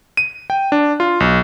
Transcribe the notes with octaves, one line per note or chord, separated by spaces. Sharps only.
D#7
G5
D4
F4
B1